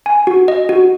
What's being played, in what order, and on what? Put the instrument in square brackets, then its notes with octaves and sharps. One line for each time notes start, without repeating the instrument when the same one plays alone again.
[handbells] G#5
F#4
D#5
F#4